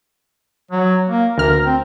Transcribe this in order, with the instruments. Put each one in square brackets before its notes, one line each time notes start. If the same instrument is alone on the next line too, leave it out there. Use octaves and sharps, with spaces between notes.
[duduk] F#3
A#3
[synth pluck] D2 F6 [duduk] A#4
[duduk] C4